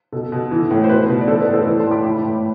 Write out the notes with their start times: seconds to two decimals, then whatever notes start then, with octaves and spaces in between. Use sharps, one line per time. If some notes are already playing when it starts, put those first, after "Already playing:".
0.12 B2 A4
0.32 B2
0.51 E3
0.71 A2
0.84 C5
0.89 B2 B4
1.09 B2
1.21 D5
1.28 E3 A4 C5
1.40 B4 D5
1.47 A2
1.54 A4 C5
1.66 E3 B4 D5
1.79 A5 C6
1.86 A2
1.91 B5 D6
2.05 E3 G5 B5
2.23 A2